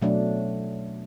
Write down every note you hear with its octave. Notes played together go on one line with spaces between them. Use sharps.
B2 F#3 A3 D4